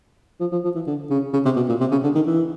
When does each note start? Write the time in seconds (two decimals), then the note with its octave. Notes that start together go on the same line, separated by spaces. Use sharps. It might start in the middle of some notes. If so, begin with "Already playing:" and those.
0.40 F3
0.52 F3
0.64 F3
0.75 E3
0.87 D3
1.10 C#3
1.33 C#3
1.45 C3
1.56 B2
1.69 A#2
1.80 C3
1.91 C#3
2.03 D3
2.15 D#3
2.27 E3